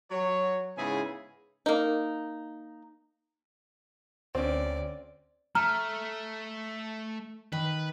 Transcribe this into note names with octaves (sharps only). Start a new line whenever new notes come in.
F#3 C#5
G#2 C#3 B3 E4 G#4 G#5
A#3 D#4
D2 C4 C#4 D5
A3 E5 A#5 F6
D#3 B4